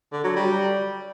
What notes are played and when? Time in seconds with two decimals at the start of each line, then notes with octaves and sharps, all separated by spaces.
0.13 D3
0.24 F#3
0.36 G3